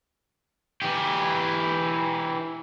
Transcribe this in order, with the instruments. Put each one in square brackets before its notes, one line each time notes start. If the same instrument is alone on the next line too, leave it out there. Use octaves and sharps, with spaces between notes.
[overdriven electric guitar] E3 G4